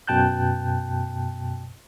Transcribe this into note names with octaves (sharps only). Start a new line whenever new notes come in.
F#2 B2 G5 A5 F#6 G6